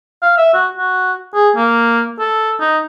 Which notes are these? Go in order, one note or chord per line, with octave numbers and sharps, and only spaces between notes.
F5
E5
F#4
F#4
G#4
A#3
A4
D#4